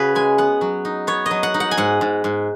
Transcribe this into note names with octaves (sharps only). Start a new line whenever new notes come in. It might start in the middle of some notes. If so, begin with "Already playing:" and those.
Already playing: C#3 F#4 G#4 B4
G#3 G#5
B3 F#5
F#3
D#4
B3 C#5
D#5
F#3
F#5
D#4
F#5
G#5
G#2 F#5
G#2
G#2